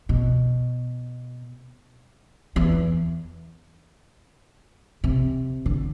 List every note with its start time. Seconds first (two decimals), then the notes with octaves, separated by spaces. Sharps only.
0.09 B2
2.56 E2
5.04 C3
5.66 D3